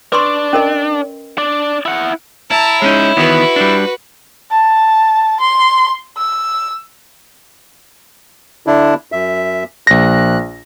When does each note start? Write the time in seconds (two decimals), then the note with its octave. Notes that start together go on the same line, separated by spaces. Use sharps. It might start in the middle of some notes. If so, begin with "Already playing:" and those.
0.12 D4 B4 C6 C#6
0.53 C#4 A#4 D#5
1.38 D4
1.85 E4 F#5
2.51 E4 A5 A#5
2.82 G#3 C#4 D#4 C#5
3.17 D#3 E3 B3 F#4 B4
3.56 G3 D4
4.52 A5
5.40 C6
6.17 E6
8.67 D3 D4 E4
9.12 F#2 E5
9.87 A#1 F#6 A#6